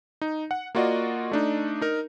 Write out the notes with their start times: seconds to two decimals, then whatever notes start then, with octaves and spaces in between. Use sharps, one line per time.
0.21 D#4
0.51 F#5
0.75 A#3 F4 F#4 D5 D#5
1.32 A3 D4 D#4
1.81 D#4 A#4